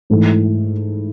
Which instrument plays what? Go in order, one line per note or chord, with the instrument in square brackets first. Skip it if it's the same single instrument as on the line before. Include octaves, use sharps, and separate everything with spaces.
[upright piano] G#2 E3 A3 E4